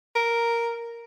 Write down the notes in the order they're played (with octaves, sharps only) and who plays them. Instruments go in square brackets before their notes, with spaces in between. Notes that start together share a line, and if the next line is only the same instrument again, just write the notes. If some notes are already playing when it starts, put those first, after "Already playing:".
[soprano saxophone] A#4